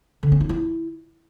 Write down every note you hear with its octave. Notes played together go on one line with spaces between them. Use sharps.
D3
C#4
D#4
E4